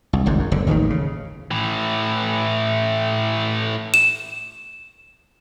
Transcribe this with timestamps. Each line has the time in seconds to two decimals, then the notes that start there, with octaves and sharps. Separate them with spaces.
0.13 C2
0.26 G#1 C#2 G#2
0.39 F#2
0.52 F#1 D3
0.67 A1 D#2 D3 D#3
0.90 C#3
1.51 A2 E3
3.94 E7